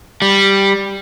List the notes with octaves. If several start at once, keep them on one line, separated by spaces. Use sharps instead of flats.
G3